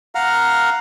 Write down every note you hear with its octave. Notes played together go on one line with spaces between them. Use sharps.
F5 F#5 A#5 F6